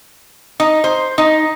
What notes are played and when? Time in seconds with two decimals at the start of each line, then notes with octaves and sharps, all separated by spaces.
0.60 D#4
0.84 C5
1.18 D#4